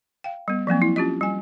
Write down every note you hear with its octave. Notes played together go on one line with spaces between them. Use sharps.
F5 G5
G3 B3
F3 F#3 A#3 C4
E4
C#4 F4 G4 D#5
G3 G#5